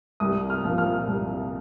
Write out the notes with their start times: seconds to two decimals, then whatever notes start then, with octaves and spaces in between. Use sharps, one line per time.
0.20 C2 D#6
0.50 F6
0.64 A#2 F3
0.78 F6
1.07 C2